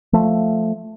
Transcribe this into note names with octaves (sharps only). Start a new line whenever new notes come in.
F3 A3